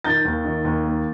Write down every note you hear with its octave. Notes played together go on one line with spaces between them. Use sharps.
D#3 G6 A6
D#2
D#3
D#2
A#3